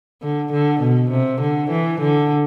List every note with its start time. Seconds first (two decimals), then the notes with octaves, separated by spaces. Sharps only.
0.22 D3
0.52 D3
0.81 B2
1.11 C3
1.41 D3
1.70 E3
2.00 D3